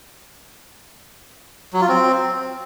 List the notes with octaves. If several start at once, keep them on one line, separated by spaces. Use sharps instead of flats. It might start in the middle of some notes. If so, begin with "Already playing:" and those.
F#3
F4
C4